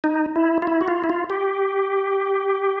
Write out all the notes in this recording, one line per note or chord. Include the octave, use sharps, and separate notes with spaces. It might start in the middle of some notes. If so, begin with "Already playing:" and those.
D#4
E4
F4
E4
F#4
F4
E4
F4
G4